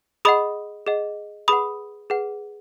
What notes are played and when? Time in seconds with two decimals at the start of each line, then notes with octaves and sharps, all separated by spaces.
0.25 G#4 D#5 F#5 B5 D#6
0.87 G#4 D#5 F#5
1.48 G#4 B4 F#5 B5 D#6
2.10 G#4 B4 F#5